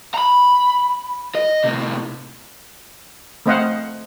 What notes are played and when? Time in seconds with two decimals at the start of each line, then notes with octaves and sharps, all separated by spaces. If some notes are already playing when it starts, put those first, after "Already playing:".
0.14 A#5 B5
1.35 D#5
1.64 A2 C3
3.46 A3 C4 C5 D#5 F5 F#5